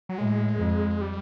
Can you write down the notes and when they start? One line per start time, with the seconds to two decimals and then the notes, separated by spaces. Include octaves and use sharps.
0.09 F#3
0.18 A2 G#3
0.60 F2
1.01 G3